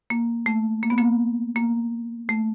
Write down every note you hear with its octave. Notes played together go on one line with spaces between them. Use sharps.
A#3
A3
A#3
B3
A#3
A#3
A3